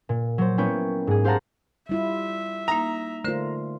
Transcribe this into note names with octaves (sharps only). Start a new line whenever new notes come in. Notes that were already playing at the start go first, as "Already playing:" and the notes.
A#2
F#3 C5
A#3 B3 C#4 E4 C#5 G5
G#2 G#4
G4 C5 F5 F#5 A5 A#5
G3 E4 F4 E5
A#3 D#4 A#5
D3 A3 F4 A#4 C5